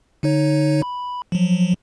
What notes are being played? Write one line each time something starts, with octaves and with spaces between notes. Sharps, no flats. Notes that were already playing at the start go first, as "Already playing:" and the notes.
D3 D#4 C#5
B5
F3 F#3